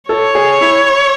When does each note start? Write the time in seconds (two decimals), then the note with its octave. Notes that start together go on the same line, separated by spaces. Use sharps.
0.09 A4 C#5
0.35 G#4
0.61 E4